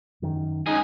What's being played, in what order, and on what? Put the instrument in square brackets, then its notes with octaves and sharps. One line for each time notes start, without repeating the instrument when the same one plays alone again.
[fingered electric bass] F#2 D#3
[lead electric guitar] C#2 G#4 [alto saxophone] D#4